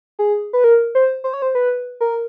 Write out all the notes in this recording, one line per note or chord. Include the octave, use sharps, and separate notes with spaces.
G#4
B4
A#4
C5
C5
C#5
C5
B4
A#4